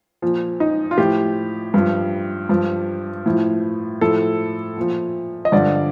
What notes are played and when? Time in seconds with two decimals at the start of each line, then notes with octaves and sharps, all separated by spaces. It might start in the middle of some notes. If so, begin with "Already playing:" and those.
0.22 A#2 F3
0.60 D#4
0.91 F4
0.98 A2 F3 G4
1.74 G2 F3
2.49 G2 F3
3.26 A2 F3
4.01 A2 F3 A4
4.77 A#2 F3
5.45 D#5
5.52 G2 D3 F3 D5